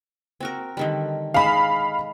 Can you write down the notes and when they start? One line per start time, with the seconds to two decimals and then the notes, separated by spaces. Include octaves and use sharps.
0.40 C4 F#4 A#4
0.77 D3 D#3 G3
1.34 G#3 D#4 A4 F5 B5